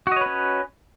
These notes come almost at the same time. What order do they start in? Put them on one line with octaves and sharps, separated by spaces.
F#4 D#5 C#5 B4 C#4